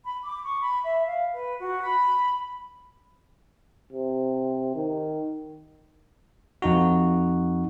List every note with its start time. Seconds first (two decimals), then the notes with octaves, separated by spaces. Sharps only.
0.04 B5
0.23 D6
0.44 C#6
0.59 B5
0.83 E5
1.05 F5
1.31 B4
1.60 F#4
1.82 B5
3.92 C3
4.75 D#3
6.62 F2 D#4 F#4